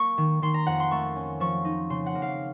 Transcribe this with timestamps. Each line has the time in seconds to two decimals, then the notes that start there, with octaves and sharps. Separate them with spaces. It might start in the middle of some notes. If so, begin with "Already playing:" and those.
Already playing: A#3 C#6
0.18 D#3
0.42 D#3 C6
0.54 A#5
0.66 F2 F#5
0.80 C6
0.91 A3 C#6
1.16 C#4
1.40 F3 C#6
1.65 D#4
1.90 C#3 C6
2.06 F#5
2.15 A#3
2.22 F5